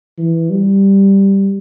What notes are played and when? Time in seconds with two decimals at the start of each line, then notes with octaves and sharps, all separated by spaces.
0.18 E3
0.50 G3